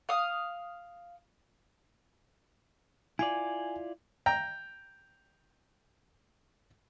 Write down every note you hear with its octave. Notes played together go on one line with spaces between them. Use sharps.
F5 D#6
E4 F4 D5 G#5
G5 A#5